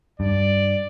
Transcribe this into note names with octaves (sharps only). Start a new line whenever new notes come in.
G2 D5